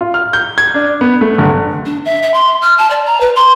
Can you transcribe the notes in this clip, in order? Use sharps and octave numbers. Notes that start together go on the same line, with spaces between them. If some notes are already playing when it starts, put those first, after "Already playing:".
F4
F6
G6
G#6
D4
B3
A3
G1
D4
E5
E5
C6
F6
A5
D5
A#5
B4
C6